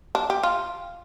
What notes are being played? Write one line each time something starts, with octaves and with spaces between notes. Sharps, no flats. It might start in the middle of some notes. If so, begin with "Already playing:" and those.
D4
G4
F4